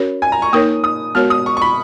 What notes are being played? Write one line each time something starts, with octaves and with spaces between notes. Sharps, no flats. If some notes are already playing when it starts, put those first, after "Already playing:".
Already playing: C#4 F#4 A#4 C#5
G#5
A#5
C#6
A#3 D#4 A#4 C#5 D#6
D#6
G#3 B3 F#4 A#4 C#5 F6
D#6
C#6
C#6
B5